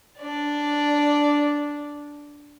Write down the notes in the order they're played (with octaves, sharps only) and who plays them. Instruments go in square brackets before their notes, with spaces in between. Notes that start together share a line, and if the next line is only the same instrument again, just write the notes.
[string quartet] D4 D5